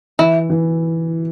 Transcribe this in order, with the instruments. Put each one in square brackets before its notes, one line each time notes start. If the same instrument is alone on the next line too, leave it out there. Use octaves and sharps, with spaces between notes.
[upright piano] E3 [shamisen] E4
[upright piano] E3